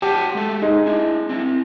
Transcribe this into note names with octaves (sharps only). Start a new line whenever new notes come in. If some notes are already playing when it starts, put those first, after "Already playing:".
F#3 G4 F#5 A5
G#3 A3 A4
G#3 D#4
D4 E4
C4 E4